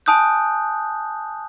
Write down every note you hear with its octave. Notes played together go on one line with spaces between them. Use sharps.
G#5 A5 D#6 F#6 G6